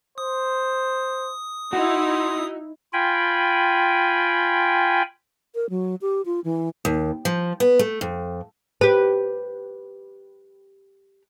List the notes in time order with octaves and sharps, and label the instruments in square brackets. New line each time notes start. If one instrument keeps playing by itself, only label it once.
[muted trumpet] C5 [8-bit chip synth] D#6
[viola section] D#4 E4 [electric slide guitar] F#4 [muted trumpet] C6
[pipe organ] F4 G5 G#5 B5
[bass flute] A#4
F#3
G4
F4
E3
[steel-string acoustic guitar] D#2
F3
B3
A3
F2
[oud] G4 B4